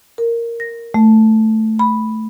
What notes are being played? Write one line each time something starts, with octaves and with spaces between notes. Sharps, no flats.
A#4
A#6
A3
B5